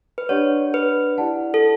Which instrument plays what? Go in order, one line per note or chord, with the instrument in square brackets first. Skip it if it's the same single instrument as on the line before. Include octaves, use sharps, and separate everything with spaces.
[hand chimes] B4
[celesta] D4 G4 D5 F#5 [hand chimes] C#5
[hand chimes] B4
[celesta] E4 G4 D5 F#5 A5
[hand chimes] A4